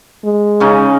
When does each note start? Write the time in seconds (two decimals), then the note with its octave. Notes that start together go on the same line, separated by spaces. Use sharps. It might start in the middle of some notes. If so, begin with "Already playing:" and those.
0.25 G#3
0.60 C#3 C#4 D#4